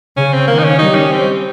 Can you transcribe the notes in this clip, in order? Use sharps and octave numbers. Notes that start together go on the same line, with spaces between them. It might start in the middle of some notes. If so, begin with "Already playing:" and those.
C#3 C#4
C4
D#3 A#3
D#4
C#4
G3 D#4
C#4
C4